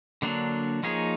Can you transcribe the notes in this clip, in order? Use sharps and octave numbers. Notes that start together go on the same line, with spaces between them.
D3 F#3 A#3 D4
F3 A#3 D#4 G#4 C#5